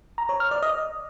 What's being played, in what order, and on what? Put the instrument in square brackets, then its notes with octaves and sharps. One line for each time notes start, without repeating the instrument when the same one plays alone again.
[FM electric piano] A#5
C#5
F6
D5
D#5